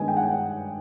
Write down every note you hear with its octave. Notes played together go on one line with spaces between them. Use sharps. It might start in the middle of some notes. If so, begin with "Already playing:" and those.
Already playing: G2 D#3 G#3 B3 D4 G#5
G5
F#5
G5